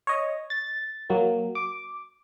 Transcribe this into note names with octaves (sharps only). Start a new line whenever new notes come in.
C#5 D#5
A6
F#3 A#3
D6